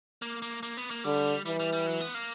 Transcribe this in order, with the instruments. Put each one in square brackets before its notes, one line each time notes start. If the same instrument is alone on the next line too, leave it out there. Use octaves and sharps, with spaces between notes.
[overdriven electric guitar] A#3
A#3
A#3
B3
A#3
[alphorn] D3 [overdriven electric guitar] G3
[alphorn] E3 [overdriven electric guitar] G3
[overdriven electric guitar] G3
G3
F#3
B3
A#3